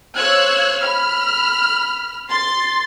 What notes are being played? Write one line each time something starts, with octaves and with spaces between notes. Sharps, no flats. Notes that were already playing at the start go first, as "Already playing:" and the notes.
C5 C#5 F5 E6 F#6 G#6
B5 F6
C6 A6